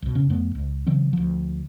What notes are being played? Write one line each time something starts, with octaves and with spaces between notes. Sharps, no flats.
C2 B2
E2 C#3 C#4
F2 A3 B3
C#2
C#3 E3 F#3 C4
D2 F3